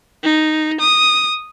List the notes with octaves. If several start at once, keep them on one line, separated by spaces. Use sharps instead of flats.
D#4
D#6